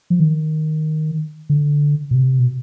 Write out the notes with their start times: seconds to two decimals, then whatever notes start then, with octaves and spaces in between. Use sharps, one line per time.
0.10 F3
0.20 D#3
1.50 D3
2.11 B2
2.15 C3
2.39 B2